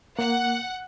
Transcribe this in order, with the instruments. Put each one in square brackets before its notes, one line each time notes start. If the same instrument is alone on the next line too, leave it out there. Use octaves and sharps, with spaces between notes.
[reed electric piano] A#3 [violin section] F#5